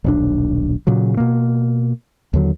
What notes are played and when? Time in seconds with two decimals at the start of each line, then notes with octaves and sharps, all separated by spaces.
0.04 D#1 B1 D4
0.87 A#2 C#3 F#3
1.17 B2 A#3
2.33 D#2 D3 F#3